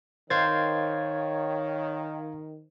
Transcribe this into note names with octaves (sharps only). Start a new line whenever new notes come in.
D#3 C5 C#5 F5 G#6 A6